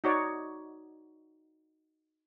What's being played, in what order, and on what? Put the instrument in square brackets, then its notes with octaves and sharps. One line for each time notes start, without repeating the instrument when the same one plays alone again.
[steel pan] D#4 F#4 C#5 D5